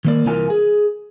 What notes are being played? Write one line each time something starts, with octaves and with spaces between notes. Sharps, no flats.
D#3 A#3 D5
C2 E3 F4 A#4 G#5
G#4